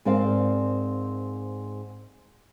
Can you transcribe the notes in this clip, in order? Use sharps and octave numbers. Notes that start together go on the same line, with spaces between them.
G#2 C4 A#4 D5 F5